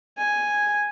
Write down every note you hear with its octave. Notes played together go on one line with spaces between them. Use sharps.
G#5